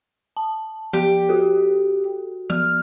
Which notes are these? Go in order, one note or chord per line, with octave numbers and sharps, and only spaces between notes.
A5
F3 G4
F#4 A4
F3 F6